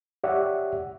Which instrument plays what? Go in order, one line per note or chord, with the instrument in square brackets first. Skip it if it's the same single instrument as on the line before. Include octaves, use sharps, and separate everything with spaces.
[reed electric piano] G4 C#5 D5 E5 F#5